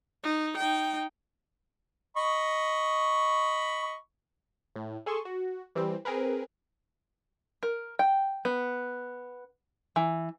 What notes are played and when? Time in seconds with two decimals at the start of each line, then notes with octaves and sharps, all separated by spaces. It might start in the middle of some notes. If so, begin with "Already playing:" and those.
0.24 D#4
0.57 D#4 G5
2.17 D#5 B5 C#6
4.76 A2
5.06 G#4 A4 G#5 A5 C6 C#6
5.25 F#4
5.75 E3 G3 C4
6.05 C4 G#4 A#4 B4
7.63 A#4
7.99 G5
8.45 B3
9.96 E3